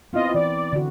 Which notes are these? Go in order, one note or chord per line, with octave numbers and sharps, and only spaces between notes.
B3 C4 E4 F4 D#5
E3 D5
D3 F#4